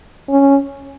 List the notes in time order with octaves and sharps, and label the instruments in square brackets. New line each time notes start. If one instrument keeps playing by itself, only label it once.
[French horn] C#4